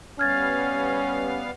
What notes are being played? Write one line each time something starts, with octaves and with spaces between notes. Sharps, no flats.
G3 B3 C#4 F5 F6 G#6 A6